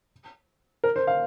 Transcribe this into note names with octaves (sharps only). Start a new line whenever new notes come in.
A#4
C5
F5